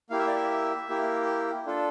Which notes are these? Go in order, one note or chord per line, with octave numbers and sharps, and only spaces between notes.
A#3 E4 G4 F5
E5
D5
E5
A#3 E4 G4
D4 F4 A4